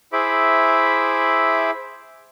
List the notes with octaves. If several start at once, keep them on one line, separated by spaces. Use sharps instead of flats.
E4 G#4 C5 E5 B5 D6